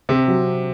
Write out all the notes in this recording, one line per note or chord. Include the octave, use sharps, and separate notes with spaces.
C3 C4
F#3